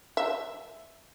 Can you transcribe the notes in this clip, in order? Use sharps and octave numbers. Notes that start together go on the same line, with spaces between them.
E5